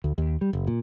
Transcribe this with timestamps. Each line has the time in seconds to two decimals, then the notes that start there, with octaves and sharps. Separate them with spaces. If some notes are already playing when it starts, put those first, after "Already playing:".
0.04 D2
0.18 D#2
0.41 G3
0.53 F#1
0.67 A#2